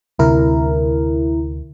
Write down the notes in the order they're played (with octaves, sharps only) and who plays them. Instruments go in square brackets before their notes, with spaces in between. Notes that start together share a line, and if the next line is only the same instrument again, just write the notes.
[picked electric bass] D2 C3 [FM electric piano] E4 A#4